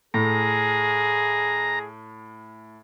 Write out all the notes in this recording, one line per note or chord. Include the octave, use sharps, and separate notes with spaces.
A2 G#4 A#5